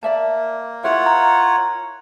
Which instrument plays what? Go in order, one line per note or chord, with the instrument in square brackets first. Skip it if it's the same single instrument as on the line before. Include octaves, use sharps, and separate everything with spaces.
[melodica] A#3 [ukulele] D5 E5 A5
[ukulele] E4 A#4 E5 [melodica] F4 C#5 F#5
[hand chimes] A#5